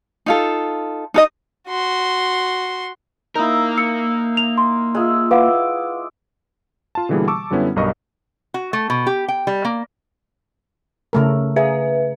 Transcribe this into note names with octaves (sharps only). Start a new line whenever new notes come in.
D#4 F4 A4
D#4 A4 D#5
F#4 C6
A#3 D#4 E4 A#4
E6 C#7
F7
C6
G#3 F4 E5
E4 B4 F5 F#5 D6
F4 A5
B2 D3 E3 G3 A#3 G#4
A5 C#6 D6 E6
F#2 D3 G3 B3 C#4 E4
B1 G2 A#4 D#5 C#6
F#4
A3
B2
G4
G5
G3
A#3
C#3 A3 A#4
G#4 B4 E5